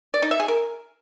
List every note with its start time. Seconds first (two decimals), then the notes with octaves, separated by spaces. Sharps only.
0.14 D5
0.22 D#4
0.31 E5
0.40 G#4
0.48 A#4